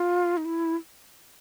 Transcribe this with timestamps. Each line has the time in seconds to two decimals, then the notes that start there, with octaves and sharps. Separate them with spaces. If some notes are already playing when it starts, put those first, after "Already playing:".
Already playing: F4
0.37 D#4
0.45 E4